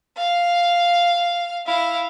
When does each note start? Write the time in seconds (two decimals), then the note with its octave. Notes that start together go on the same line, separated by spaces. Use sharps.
0.17 F5
1.66 E4 F5